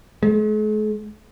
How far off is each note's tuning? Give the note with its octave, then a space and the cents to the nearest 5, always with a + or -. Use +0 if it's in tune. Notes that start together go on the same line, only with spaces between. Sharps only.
G#3 +45